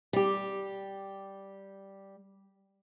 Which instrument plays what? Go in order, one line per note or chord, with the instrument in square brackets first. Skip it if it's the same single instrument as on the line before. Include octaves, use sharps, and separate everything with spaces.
[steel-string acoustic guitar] G3 G4